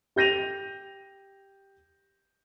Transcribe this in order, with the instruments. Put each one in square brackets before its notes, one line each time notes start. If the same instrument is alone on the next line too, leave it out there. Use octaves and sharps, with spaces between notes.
[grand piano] G4 G6 A#6 D#7 F7